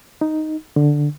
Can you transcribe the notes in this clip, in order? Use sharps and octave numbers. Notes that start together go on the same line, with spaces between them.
D#4
D3